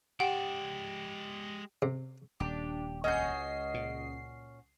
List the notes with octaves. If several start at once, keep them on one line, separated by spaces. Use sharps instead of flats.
G#3 G4 D5 F#5 G5 E7
C3
D#1 D4 G4
C#2 C#4 F#4 D#5 G6 C7
A#2